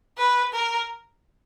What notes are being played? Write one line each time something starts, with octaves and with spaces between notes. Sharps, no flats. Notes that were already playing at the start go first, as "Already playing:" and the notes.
B4
A#4